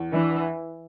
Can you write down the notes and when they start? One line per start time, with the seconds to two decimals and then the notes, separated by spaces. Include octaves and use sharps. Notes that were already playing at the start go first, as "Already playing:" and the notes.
Already playing: E2
0.12 E3 D4